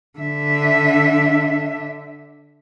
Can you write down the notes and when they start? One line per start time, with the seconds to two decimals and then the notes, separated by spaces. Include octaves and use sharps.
0.19 D3 E5